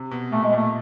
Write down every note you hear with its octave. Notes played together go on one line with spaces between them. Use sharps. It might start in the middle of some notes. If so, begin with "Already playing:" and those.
Already playing: C3
B2
A#2 A3
G#3
A#2 A3